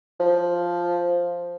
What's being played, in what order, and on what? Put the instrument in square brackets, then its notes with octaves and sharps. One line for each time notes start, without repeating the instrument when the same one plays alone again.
[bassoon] F3